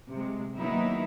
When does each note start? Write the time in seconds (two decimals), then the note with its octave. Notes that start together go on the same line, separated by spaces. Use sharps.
0.10 C3 G#3
0.58 D#3 F#3 A#3 B3 D#4 E4